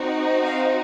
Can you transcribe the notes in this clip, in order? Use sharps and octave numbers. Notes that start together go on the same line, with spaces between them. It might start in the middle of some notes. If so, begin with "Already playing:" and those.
Already playing: C4 D#4 F#4
F5